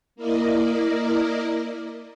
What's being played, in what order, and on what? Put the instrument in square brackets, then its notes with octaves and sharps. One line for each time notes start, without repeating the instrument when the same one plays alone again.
[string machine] A#3 E4 A#4 D5 D#5